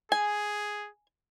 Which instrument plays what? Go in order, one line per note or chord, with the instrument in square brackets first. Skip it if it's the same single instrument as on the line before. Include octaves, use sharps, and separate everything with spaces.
[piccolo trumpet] G#4 [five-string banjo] G#5